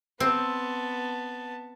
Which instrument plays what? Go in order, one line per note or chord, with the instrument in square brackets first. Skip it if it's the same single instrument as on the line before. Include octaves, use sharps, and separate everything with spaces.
[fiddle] B3 A5 [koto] C4